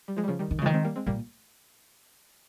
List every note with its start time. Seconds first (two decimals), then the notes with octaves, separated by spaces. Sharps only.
0.08 G3
0.17 F3 G#3
0.23 G3
0.28 C#3 F3
0.39 D#3 G3
0.51 D#3
0.58 C#3
0.62 D#3 F3 G#3
0.73 G#3 C4
0.84 G3 A#3
0.96 G#3 C4
1.06 A#2 G3 A#3